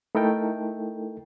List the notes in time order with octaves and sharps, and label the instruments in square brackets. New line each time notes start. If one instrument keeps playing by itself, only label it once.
[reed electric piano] A3 D#4 E4 A4 A#4 G5